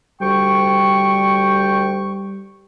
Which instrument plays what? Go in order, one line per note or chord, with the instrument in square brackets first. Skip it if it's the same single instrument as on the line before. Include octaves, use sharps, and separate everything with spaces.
[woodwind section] D2 G5 C#6 [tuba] G3